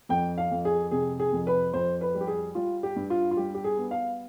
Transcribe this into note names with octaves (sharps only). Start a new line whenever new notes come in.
F2 G5
F5
F2
G#4
C3 G#4
G#4
F2
B4
F2 C5
B4
G3
G4
G#4
G3 F4
G4
G2
F4
F4
G3 G4
G4
G#4
B3
F5